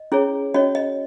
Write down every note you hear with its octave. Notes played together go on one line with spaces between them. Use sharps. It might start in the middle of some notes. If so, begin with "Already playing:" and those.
Already playing: D#5
C#4 E4 G#4 C#5
C#4 F#4 C#5 D#5
D#5